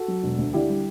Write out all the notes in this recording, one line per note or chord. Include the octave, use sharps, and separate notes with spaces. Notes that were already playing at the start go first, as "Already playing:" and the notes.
Already playing: F#4 A4
F#3
E1
D2
D3 E4 G4
G3